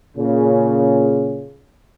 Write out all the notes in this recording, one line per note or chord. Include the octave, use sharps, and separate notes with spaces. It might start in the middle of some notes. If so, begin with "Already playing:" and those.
A#2 C#3